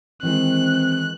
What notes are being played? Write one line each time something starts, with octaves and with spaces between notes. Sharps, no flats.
D#3 E3 G#3 C4 F#6